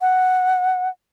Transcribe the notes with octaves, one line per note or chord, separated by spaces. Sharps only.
F#5